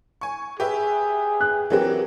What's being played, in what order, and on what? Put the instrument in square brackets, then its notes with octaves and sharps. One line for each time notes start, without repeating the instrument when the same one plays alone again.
[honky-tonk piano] G#5 C#6
[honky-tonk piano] G4 B4 E5 [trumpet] G#4
[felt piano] F#6
[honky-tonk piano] E3 F#3 C4 [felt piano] G4 A#4 B4